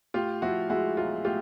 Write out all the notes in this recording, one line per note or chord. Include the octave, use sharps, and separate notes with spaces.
A2 F4 G4
F3 E4 F#4
G#3 E4 F#4
B1 F4
A2 F4 G4